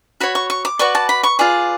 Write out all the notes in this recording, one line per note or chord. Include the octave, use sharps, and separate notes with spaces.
F#4 C#5 B5
C#6
C#6
D6
F#4 B4 D5 C#6
A5
B5
C#6
F4 G#4 B4 D5